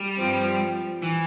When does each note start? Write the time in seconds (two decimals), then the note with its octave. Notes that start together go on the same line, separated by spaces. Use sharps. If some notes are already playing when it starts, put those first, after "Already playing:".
Already playing: G3
0.16 G2 F3 C4
1.02 E3